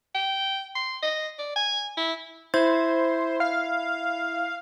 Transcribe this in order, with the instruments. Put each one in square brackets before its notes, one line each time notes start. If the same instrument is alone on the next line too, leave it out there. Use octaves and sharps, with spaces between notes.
[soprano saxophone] G5
C6
D#5
D5
G#5
E4
[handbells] E4 E5 G#6 [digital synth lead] C5
[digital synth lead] F5